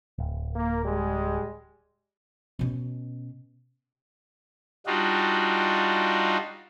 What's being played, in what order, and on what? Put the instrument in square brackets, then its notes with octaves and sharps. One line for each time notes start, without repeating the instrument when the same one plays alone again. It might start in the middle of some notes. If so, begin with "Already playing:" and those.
[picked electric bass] D1
[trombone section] A#3
G3 G#3
[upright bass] B2 C#4
[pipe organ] G3 D4 D#4 F4 F#4